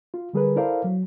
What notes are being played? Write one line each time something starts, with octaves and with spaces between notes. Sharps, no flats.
F4
D3 G3 G#4 A#4 B4
E4 A4 A#4 C5 D5 F5
F#3